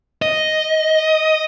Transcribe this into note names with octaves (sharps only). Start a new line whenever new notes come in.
D#5